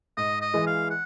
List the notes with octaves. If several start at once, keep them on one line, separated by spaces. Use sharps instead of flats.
G#2 D#5
D#5
E3 G#3
F5
F#5